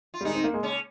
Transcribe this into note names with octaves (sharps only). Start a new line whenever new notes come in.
F4
G3
D#3 G#3 D#4
C4
A#3
G#3
C#3 C#4